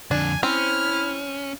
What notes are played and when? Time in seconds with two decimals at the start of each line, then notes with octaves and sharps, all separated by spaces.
0.11 F2 D3 D4 G#5
0.43 C4 C#4 E4 F6